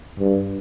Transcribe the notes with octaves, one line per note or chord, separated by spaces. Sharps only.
G2